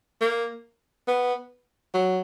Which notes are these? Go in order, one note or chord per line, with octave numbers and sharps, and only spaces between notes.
A#3
B3
F#3